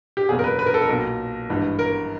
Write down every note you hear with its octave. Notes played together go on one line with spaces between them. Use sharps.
G4
F#1 E2 B2 G#4
A#4
B4
B4
A#4
A4
A#4
B1 A#2
G#1 G2 E3
A#4